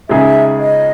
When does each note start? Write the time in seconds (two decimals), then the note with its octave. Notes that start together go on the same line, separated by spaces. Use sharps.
0.09 C#2 C#3 G#3 D#4 G#4 E5
0.59 D#5